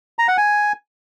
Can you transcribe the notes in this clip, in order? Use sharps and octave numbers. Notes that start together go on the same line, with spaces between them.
A#5
F#5
G#5